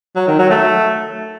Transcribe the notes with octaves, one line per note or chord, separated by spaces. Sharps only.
F#3
D#3
F#3
A3